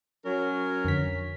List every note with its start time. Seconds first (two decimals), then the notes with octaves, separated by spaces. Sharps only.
0.25 F#3 C#4 A#4
0.85 F2 D3 B6